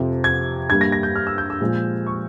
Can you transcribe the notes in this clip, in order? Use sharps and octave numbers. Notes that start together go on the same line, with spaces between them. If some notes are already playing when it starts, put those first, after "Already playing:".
Already playing: F2 C3 F3
G#6
G2 G3 A#3 G#6
A#6
A#6
G6
F6
E6
G6
E6
A#2 F3 G#3
C#6